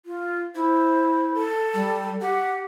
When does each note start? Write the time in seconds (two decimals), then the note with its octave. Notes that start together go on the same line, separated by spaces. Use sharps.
0.06 F4
0.55 E4 C5
1.34 A4
1.74 G3
2.22 G4 F#5